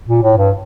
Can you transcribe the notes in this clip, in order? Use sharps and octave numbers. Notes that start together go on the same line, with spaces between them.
A#2
A2
G2